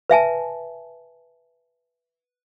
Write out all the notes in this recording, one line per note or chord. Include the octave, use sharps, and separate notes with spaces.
B4 E5 G#5 A5